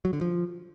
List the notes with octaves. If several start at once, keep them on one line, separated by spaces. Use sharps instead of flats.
F#3
D3
F3